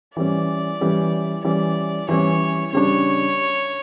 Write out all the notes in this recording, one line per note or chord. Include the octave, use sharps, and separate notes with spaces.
E3 G3 C#4 D5
E3 G3 C#4
E3 G3 C#4 D5
E3 G3 C#4 C#5
C#3 G3 D4 C#5